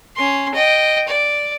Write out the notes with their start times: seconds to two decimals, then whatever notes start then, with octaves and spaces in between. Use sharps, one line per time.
0.16 C#4 C6
0.54 D#5 G5
1.08 D5